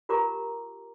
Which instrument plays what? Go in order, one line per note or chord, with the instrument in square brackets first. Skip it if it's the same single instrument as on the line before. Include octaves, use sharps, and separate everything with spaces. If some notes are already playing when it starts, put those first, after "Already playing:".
[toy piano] F4 G4 A#4 A5 A#5 D6